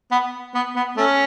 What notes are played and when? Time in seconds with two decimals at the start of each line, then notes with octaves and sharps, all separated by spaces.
0.11 B3
0.54 B3
0.76 B3
0.97 A3 C#4